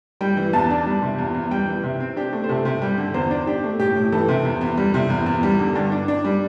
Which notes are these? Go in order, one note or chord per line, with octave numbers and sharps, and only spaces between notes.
G3 G5
E3
E2 A5
D4
G3
C3
E2
E2
G3 G5
E3
C3
C4
D4 G4
A3
C5
C3 A4
C3
G3 G4
D3
E2 C5
D4
D4 G4
A3
A2 G4
A2
E3 A4
C3
E2
E2
G3
C3
E2
E2
G3
D3
G2
D4
D4
G3